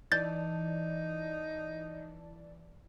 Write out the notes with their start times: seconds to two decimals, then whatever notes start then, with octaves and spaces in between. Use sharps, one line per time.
0.12 E3 D#4 D5 A5 G6 A6